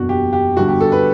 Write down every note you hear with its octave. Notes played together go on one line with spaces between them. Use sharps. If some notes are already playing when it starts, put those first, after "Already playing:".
Already playing: F#1 E2 B2 D4 F#4
G4
G4
G1 G2 D3 F#4
G4
A4
B4